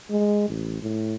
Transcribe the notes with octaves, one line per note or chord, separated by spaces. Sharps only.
G#3
A1
A2